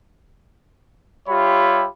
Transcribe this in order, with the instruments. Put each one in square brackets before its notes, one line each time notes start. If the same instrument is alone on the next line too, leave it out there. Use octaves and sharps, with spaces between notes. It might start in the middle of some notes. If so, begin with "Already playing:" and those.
[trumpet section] G3 F4 G4 C#5 E5 B5